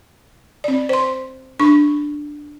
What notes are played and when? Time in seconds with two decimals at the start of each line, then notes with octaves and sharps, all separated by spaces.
0.64 C4 D5
0.89 C5 C6
1.60 D4 C#6